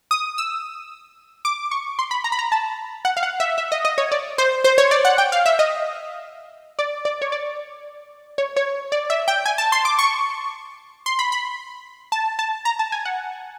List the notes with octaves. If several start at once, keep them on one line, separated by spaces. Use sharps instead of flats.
D#6
E6
D6
C#6
C6
B5
A#5
B5
A#5
A5
F#5
F5
F#5
E5
E5
D#5
D#5
C#5
D5
C5
C5
C#5
D5
F#5
G5
F5
E5
D#5
D5
D5
C#5
D5
C#5
C#5
D5
E5
G5
G#5
A5
C6
D6
C#6
C6
B5
B5
A5
A5
A#5
A5
G#5
F#5